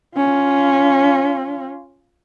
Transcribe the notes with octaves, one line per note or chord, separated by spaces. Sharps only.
C#4 F4